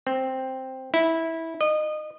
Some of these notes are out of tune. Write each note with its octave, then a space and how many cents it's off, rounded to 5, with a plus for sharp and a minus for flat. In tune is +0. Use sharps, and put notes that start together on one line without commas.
C4 +0
E4 -15
D#5 -25